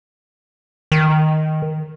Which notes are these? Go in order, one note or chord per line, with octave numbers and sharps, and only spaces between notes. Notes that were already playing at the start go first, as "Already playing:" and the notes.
D#3